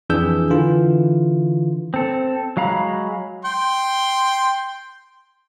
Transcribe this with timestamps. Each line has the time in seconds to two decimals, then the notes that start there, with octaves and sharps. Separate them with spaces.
0.10 F2 E3 D4 G#4 E6 G6
0.50 D3 E3 F4
1.94 C4 A4
2.57 F#3 G#3 F5 A#5 B5
3.45 G5 C6